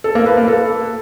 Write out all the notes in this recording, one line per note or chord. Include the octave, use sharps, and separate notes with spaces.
A4
A#3
B4
A#3
A4